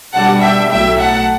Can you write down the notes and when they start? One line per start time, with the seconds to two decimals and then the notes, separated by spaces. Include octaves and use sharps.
0.13 B2 G3 D4 F#5 A5
0.42 E5 G5
0.71 B1 A2 F#3 E5 G5
1.00 F#5 A5